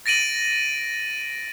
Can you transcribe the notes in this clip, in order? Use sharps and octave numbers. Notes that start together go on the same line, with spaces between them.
A6 A#6 D7 D#7 F#7